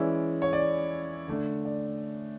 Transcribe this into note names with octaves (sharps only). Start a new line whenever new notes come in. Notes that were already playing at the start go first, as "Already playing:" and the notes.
Already playing: E3 G#3 C#4 E4 D5
C#5
D5
D3 A3 D4
D5